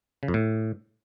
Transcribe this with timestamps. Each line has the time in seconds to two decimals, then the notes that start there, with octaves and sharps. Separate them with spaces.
0.23 C#3
0.28 F2
0.34 A2